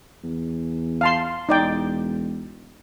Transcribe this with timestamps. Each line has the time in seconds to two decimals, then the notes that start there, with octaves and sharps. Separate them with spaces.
0.24 E2
1.01 F5 A5 C6
1.49 E1 D#4 D5 G5